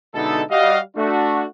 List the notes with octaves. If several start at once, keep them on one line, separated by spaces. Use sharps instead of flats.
B2 D3 G#3 D#4 E4 A4
G3 F#4 D#5 F5
A3 D4 F#4